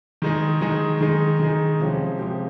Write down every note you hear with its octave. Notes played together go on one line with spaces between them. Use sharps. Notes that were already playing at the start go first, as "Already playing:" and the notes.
D#3 G#3 D#4 G#4
D#3 G#3 D#4 G#4
D#3 G#3 D#4 G#4
D#3 G#3 D#4 G#4
C3 F3 G#3 C#4 G4
C3 F3 G#3 C#4 G4